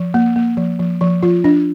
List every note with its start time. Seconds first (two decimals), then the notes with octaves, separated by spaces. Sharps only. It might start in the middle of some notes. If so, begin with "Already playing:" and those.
Already playing: F3
0.14 A#3
0.36 A#3
0.57 F3
0.79 F3
1.01 F3
1.23 F3 F4
1.44 D4